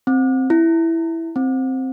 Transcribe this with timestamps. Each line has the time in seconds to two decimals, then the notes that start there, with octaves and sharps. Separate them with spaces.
0.07 C4
0.50 E4
1.36 C4